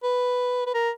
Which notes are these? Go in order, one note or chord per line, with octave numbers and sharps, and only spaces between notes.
B4
B4
A#4